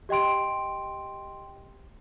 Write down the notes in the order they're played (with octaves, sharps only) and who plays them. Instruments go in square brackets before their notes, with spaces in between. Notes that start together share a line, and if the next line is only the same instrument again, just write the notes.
[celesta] G4 D#5 G5 C6 D7